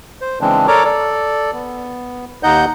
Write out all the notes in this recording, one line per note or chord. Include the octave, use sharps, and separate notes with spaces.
C5
C#3 E3 G#3 C4 D4
A4 A#4 C#5 D5 A#5 D6
A4 D5
B3
D#2 D#4 D#5 F#5 G6